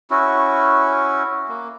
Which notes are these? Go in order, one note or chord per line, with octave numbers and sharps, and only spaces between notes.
C#4 E4 F#4
A#3